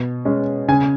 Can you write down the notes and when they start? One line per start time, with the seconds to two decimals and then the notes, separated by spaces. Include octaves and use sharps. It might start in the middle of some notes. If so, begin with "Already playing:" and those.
Already playing: B2
0.25 G#3 C#4
0.68 C#3 G#5